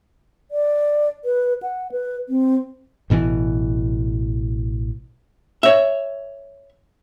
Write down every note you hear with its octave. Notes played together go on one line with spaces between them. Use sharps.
D5
B4
F#5
B4
C4
A1 B2 D#3 E3
C#5 E5